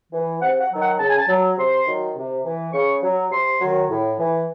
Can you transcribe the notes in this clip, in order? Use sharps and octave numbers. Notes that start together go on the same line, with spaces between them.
E3
C3 F#5
F#5
D#3 F#3
F#5
C#3 A5
G#5
A5
F#3
C3 C6
D#3 F#3
C3
E3
C#3 C#6
F#3
C3 C6
D#3 F#3
A2
E3